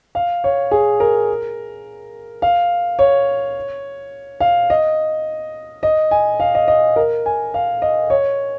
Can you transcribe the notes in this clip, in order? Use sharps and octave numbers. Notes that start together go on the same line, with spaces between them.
F5
C#5
G#4
A#4
F5
C#5
F5
D#5
D#5
G#5
F5
D#5
D#5
A#4
G#5
F5
D#5
C#5